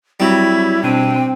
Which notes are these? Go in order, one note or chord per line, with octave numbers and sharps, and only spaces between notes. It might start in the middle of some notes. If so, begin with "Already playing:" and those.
F#3 G3 C4 E4 F#4
B2 C4 D4 G5 D#7